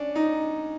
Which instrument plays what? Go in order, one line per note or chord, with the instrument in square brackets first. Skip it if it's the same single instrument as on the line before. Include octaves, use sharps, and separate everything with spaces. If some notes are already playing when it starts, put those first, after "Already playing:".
Already playing: [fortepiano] C#4 D4
D#4